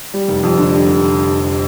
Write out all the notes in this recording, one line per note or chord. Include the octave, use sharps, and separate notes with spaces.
G3
F1
F2
D3
G3
F1